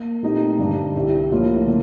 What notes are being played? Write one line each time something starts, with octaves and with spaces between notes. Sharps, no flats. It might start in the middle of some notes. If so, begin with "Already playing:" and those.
Already playing: A#3
A#2 A3 C4 D#4 G4
G2 D3 G3 D4
C2 C3 G3 C4 G4
A2 F3 A#3 F4
D3 F3 A#3